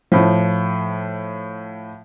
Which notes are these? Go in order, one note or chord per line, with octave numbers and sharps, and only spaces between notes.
A2 F3